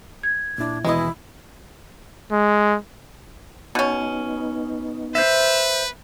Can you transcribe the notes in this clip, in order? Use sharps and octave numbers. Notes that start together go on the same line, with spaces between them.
G#6
A#2 D4 E4
D#2 B2 E3 G#3 E4 D#5
G#3
B2 B3 C#4 D#4
B4 C5 E5